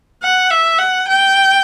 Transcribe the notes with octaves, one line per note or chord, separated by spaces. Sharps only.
F#5
E5
F#5
G5